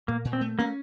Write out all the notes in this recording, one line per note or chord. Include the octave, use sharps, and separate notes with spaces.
A#2 A#3
A#2
C4
A3
A#3 C#4